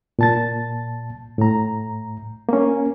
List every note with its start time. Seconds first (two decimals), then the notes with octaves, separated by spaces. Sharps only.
0.19 A#2 A5 A6
1.38 A2 A#5
2.49 A#3 C#4